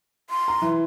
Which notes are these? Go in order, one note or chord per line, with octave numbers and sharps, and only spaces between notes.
C6
A#5
E3